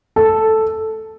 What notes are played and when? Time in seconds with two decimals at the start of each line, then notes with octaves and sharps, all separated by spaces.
0.16 A4